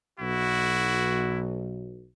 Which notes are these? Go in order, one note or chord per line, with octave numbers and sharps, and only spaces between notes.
B1 E4 F#4